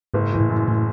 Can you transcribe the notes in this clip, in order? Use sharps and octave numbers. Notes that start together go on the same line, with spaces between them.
F#1 G#2
G#2 E3
A2
F#2
A2